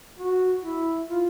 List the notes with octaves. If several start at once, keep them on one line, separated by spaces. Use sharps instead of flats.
F#4
E4
F4